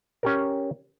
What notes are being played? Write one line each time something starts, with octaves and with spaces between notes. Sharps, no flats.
C#4 G4 A#4